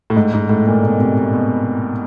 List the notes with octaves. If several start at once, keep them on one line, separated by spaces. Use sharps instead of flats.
A2
G#2
G#2
A2
A#2
B2
C3
B2